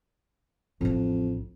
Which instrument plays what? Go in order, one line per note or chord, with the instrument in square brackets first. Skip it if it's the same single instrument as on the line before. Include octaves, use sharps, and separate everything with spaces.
[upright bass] A1 D4 [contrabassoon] F2